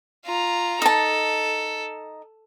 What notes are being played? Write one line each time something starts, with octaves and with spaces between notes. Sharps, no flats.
F4 A#5
D#4 A4 A5